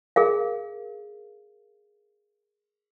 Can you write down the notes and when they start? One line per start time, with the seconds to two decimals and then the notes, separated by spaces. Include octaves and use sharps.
0.16 G#4 A#4 F5